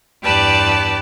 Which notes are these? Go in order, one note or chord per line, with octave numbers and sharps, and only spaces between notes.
E2 G2 G4 B4 D5 A5